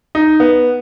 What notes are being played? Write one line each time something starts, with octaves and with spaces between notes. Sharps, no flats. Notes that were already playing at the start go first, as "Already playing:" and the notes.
D#4
B3